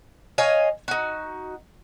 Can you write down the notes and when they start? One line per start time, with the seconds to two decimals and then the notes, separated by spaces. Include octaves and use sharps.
0.38 C#5 D#5 F5 G#5
0.88 D#4 F#4